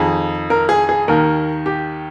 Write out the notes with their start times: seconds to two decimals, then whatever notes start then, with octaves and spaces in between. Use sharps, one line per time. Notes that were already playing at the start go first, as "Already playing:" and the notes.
Already playing: F2 D#3 G#4
0.50 A#4
0.69 G#4
0.89 G#4
1.08 D#2 D#3 A#4
1.66 G4